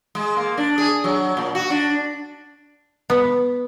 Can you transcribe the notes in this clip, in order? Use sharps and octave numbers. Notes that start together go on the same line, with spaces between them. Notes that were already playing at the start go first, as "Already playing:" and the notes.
G#3
A#3
D4
G#4
F#3
A#2
F#4
D4
B3